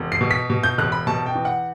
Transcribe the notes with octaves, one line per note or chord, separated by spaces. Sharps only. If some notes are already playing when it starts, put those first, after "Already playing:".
Already playing: E1
C7
B2
B6
B2
G6
E1 F#6
B5
B2 A5
G5
E2
F#5